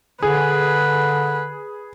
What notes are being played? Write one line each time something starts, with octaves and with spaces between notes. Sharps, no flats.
D3 G#4 B4